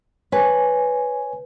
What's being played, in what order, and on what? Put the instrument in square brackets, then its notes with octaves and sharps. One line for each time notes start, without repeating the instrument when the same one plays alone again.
[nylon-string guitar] B4 [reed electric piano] C#5 G#5